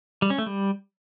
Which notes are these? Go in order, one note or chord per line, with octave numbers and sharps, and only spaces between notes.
G3
C#4
A3
G3